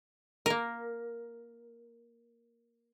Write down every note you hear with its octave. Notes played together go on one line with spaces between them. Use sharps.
A#3 A#4